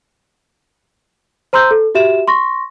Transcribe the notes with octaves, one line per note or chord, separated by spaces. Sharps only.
C5 A#5 C6 E6 G6
A4
F#4 G4 E5 E7
C6 C#6 A#6